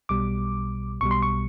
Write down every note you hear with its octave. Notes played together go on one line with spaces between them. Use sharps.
B1 B2 G3 D6
B1 B2 G3 C#6
C6
C#6